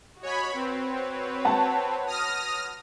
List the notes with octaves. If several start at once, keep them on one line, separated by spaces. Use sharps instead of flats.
F#4 C#5 D#5 G#5 B5
C4 F#4 B4 C#5
F#5 A5
D#6 F6 A#6